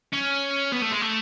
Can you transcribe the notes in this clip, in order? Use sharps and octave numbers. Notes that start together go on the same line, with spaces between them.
C#4
B3
A3
G#3
A3